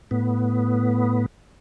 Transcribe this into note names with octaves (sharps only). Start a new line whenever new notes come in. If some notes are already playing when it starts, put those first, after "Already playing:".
A2 B3